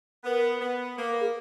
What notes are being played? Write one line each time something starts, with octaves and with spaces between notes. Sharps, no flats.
B3 A#4
B3
A#3 B4
A#4
G#4